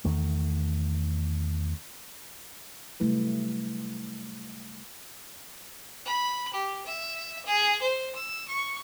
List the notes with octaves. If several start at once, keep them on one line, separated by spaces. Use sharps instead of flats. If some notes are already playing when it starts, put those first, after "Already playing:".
E2 D#3 A3
C3 F#3 G3 A3 E4 B4
B5
G4
E5
G#4
C5
E6
C#6